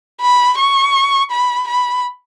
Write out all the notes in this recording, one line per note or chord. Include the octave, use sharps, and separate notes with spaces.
B5
C#6
B5
B5